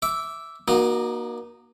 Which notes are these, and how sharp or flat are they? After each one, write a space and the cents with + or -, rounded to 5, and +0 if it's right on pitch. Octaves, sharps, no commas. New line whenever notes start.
E5 +0 D6 -15
A#3 +25 D#4 -20 F#4 +0